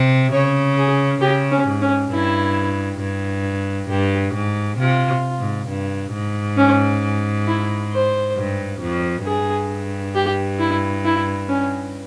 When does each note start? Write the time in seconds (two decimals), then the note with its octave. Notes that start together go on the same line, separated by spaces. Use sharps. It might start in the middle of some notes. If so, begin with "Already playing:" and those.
Already playing: C3
0.32 C#3 C#5
0.76 G#4
1.21 C#3 G4
1.52 C#4
1.67 G#2
1.82 C#4
2.12 G2 E4
3.01 G2
3.89 G2 G4
4.35 G#2
4.78 C3 F4
5.39 G#2
5.68 G2
6.13 G#2
6.57 C#4
7.47 E4
7.92 C5
8.36 G2
8.81 F2
9.25 G2 G#4
10.15 G4
10.59 E4
11.05 E4
11.49 C#4